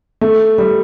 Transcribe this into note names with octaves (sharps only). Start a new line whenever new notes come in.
A3
G3